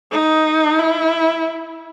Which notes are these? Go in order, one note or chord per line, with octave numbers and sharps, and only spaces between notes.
D#4
E4